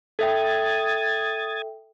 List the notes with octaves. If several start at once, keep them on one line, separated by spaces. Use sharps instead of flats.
A4 E5 G5 D#6 G#6 A6